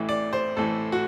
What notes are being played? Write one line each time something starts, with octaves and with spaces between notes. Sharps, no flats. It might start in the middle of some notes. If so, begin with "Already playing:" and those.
Already playing: A1 A2 E3
D5
C5
A1 A2 E3 A4
F#4